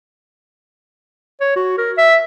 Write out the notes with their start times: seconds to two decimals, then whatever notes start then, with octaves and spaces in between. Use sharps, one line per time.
1.41 C#5
1.56 F#4
1.78 A#4
1.98 E5